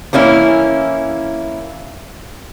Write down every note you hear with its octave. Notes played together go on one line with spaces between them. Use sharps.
E3 A#3 C#4 E4